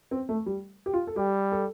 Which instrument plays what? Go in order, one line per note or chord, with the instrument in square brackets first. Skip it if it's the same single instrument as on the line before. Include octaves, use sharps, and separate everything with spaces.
[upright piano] C4
A3
G3
G4
F4
A4
[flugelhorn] G3 [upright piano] G4
[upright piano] A4